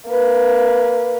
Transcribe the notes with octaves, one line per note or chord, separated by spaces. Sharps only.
A#3 B4